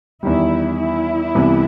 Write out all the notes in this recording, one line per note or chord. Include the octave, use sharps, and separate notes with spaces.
E2 D#3 G3 E4
E4
C2 C3 E3 B3